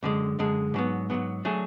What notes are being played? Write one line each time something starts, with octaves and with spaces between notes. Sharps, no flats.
F#2 D3 G#3
F#2 D3 G#3
G#2 F#3 B3
G#2 F#3 B3
F#3 A3 D4 G#4